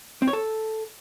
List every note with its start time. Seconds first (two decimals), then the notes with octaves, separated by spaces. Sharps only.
0.22 C4
0.28 C#5
0.33 A4